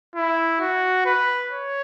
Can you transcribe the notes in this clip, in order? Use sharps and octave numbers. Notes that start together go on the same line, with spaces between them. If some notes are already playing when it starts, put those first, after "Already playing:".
E4
F#4
B4
C#5